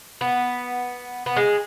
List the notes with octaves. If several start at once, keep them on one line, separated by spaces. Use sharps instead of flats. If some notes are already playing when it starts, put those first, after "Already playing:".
B3
B3
G#3